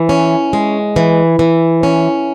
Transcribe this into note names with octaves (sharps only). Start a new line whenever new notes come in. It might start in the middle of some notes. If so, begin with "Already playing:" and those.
Already playing: E3
C#4
G#3
E3
E3
C#4